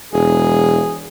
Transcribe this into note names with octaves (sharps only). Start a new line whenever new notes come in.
E1 G#4